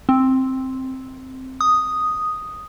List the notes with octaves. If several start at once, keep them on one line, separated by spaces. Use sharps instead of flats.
C4
D#6